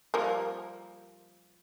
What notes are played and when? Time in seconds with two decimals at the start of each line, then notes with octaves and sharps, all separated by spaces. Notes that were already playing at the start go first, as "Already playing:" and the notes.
0.14 F3 G3 A#3